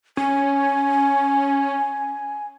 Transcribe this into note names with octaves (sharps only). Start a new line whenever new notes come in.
C#4 G#5